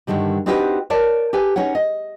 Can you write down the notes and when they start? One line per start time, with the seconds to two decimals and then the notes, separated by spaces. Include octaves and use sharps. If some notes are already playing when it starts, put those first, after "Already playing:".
0.07 G2 A#2 D3 D#3 G3
0.46 C4 D4 D#4 F#4 G4 B4
0.90 A#4 C#5 D5 A5
1.33 G4 A4 B4 G#5
1.56 C#4 D#4 C#5 F#5
1.75 D#5